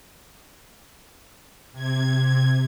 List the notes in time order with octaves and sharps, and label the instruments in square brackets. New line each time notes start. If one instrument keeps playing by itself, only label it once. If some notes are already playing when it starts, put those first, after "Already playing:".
[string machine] C3 G#6